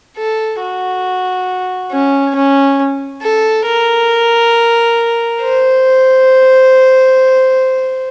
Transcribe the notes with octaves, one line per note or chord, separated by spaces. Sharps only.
A4
F#4
C#4
C#4
A4
A#4
C5